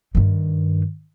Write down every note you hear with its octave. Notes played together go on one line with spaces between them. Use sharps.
G2 D#3